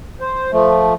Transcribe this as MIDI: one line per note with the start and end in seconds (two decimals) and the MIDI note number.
0.20 0.51 72
0.52 0.94 53
0.52 0.94 57